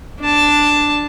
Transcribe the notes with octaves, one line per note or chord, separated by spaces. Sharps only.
D4 A5